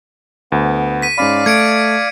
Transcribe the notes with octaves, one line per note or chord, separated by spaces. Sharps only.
D2 B3
B6 D#7
G#2 C#4 D5 F5 B5
A3 G#6 C#7 D7